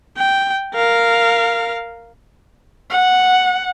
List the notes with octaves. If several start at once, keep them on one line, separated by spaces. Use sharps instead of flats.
G5
A#4 F5
F#5